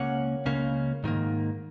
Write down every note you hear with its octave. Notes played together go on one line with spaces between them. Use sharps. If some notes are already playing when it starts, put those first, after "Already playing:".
Already playing: C#2 C#3 A#3 C#4 C#5 F#5
C#2 C#3 A#3 C#4
G#2 D#3 A#3